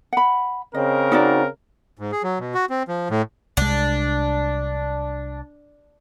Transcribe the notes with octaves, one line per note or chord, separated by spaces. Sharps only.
F#5 B5
C#3 C4 A#4 D#5
D#4 F#4 D5
G#2
G#4
F#3
B2
F#4
C4
F3
A2
C2 G#3 D4